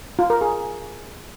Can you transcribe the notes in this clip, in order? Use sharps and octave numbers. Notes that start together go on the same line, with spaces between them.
F4
A#4
G#4